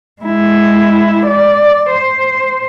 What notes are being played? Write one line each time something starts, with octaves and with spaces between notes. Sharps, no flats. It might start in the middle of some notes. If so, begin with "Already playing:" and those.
G#3 E4
D5
C5